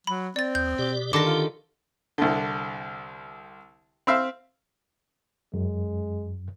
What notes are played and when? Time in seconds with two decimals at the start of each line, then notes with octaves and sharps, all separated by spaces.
0.07 F#3 B5
0.36 C4 D5 A6
0.55 D#2 G6
0.78 B2 G4 D5
1.13 D3 D#3 D4 G4 G5 A5 D6 A#6
1.26 F4
2.18 C2 D3
4.07 C4 E5 F5
5.54 F#2 G#3